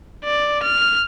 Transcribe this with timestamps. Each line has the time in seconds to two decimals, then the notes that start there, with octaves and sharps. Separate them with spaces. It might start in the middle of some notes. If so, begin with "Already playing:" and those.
0.25 D5
0.63 F6